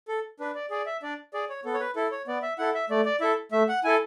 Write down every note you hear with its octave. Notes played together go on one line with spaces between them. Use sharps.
A4
D4 B4
D5
G#4 D5
E5
D4 D5
G#4 D5
C#5
B3 A4
C#5
B4
E4 A4
C#5
B3 D5
E5
E4 A4 F#5
E5
A3 D5
D5
E4 A4 E5
A3 E5
F#5
E4 A4 G#5